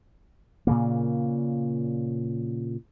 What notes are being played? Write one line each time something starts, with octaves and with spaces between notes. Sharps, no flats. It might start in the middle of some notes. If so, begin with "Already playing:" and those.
A#2 C#3 A#3